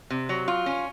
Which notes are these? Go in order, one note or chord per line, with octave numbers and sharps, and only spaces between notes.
C3
F#3
F4
C#4